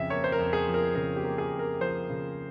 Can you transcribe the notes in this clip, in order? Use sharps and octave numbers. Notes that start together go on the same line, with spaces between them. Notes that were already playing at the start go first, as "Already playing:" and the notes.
Already playing: F2 C#3 F3 E5
A#3 C#5
C5
A#4
F2
G#4
F3
A#4
C#3 A#4
G4
A#3
G#4
F2
A#4
F3 C5
C#3